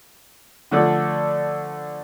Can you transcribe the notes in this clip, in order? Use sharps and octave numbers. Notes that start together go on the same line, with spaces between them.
D3 F3 A3 D4 A4 D5